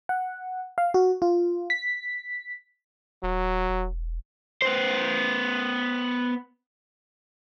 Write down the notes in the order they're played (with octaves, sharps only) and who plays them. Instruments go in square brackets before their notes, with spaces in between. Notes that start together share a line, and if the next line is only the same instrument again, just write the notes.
[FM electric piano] F#5
F5
F#4
F4
B6
[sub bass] D#1 [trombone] F#3
[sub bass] E1
[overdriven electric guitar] B3 C5